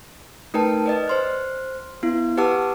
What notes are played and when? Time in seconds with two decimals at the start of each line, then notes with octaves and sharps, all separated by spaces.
0.54 A3 D#4 A#4 B4 G5 A5
0.86 B4 D5 D#5
1.08 C5 C6 F6
2.03 B3 E4
2.37 G4 B4 F#5 A5 D6 E6